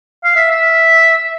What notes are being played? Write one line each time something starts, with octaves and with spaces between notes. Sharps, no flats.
F5
E5
E5